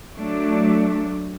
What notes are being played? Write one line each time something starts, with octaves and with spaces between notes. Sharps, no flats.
F#3 A3 D4